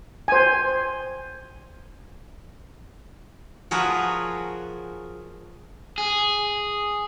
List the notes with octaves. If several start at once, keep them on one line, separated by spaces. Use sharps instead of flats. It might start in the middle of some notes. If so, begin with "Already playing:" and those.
C5 G#5
F3 F#4 G#4 A#4 B4 C#5
G#4